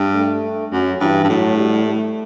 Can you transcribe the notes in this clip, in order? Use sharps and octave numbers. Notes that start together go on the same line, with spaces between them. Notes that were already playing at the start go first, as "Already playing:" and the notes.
Already playing: G2
A3
F#2 F#3
G2 E3
G2
A2 F#3
G3
A3